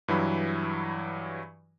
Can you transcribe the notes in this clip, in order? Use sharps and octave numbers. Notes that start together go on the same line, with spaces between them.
G2 E3 F#3 B5